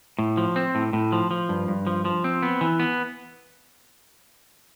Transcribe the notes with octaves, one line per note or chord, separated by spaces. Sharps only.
A2
F3
C4
A2
A2
F3
F3
G2
G2
F3
F3
C4
B3
E3
B3